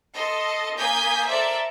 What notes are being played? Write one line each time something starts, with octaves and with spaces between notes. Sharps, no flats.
A4 D#5 C6
A#3 G#5 D#6 G6 G#6 B6
A4 A#4 C5 D5 E5